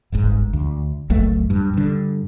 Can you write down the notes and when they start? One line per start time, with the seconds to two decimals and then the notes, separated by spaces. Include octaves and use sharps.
0.12 D1 G1 G#2
0.53 D2
1.10 F#1 C#2 F#3 A3
1.50 G2
1.73 G2 D3